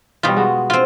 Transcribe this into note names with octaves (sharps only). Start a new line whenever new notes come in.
B2 E3 G3 F4
G#3 B3 F#4
C4 F4